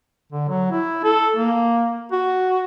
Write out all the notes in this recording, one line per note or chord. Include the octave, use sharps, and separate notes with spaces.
D3
F#3
E4
A4
A#3
F#4